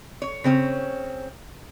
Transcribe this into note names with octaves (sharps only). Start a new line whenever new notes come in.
C#5
C#3 C4 C#4